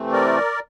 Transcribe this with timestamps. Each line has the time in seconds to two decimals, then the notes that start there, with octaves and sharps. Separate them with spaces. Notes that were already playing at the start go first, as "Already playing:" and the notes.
Already playing: C3 E3 A3 C4
0.12 A#4 D5